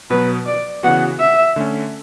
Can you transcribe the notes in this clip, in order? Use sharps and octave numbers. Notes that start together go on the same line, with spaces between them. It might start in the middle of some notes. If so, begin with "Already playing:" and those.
B2 F#3 B3 B4
D5
C#3 E3 B3 F#4 F#5
E5
D3 A3 C#4